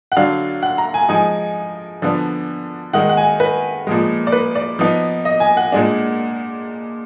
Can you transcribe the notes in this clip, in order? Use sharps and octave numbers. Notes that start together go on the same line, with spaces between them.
F#5
D3 F#3 D4 F5
F#5
A#5
G#5
F3 G#3 D#4 G#5
D3 F3 B3 D4
D#3 G#3 D#4 F#5
F#5
G#5
B4
A#2 F3 G#3
D5
B4
D5
F3 B3 D#4
D#5
G#5
F#5
A#2 G#3 D4